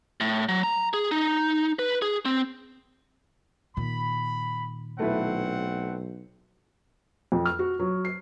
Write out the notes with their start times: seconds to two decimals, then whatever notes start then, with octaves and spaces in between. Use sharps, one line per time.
0.21 A2
0.49 F#3
0.63 A#5
0.94 G#4
1.11 D#4
1.79 B4
2.02 G#4
2.25 C4
3.77 A#2 D#3 B5
4.99 B1 A3 C4 E4 B4 F#5
7.32 F2
7.45 F6
7.59 F#4
7.79 F#3
8.05 C7